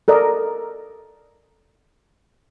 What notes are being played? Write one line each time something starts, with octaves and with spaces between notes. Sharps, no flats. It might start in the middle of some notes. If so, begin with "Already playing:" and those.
A4 A#4 D5 D#5